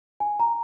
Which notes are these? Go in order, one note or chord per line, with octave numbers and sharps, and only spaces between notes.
G#5
A#5